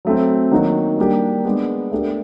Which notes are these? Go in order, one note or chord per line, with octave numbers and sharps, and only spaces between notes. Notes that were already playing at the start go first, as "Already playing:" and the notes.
F#3 A3 C4
D#3 F#3 A#3 D#4 F#4
G3 A#3 D4 G4
G#3 B3 D4
A3 D4 G4 A#4